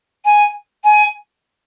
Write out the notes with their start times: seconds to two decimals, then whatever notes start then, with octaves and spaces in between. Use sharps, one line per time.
0.25 G#5
0.84 G#5